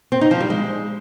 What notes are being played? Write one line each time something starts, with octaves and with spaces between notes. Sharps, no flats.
C4
D#4
F3
G3
G#3